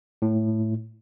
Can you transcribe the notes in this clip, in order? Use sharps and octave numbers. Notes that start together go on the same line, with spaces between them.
A2